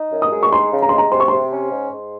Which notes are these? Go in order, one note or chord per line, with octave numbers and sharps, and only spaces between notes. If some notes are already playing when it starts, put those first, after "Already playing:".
Already playing: D#4
F#2
D#6
G#3
C#6
D#4 C6
C#3
A#5
C6
G#3
A#5
C3 C6
C#6
C3 C6
C#4
G#2
G#2